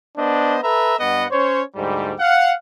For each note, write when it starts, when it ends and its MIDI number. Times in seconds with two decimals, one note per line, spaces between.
0.17 0.58 59
0.17 0.58 62
0.17 0.58 72
0.17 0.58 75
0.63 0.94 69
0.63 0.94 71
0.63 0.94 76
0.63 0.94 82
0.98 1.25 43
0.98 1.25 59
0.98 1.25 75
0.98 1.25 78
1.31 1.62 61
1.31 1.62 72
1.31 1.62 73
1.76 2.13 38
1.76 2.13 44
1.76 2.13 55
2.18 2.52 77
2.18 2.52 78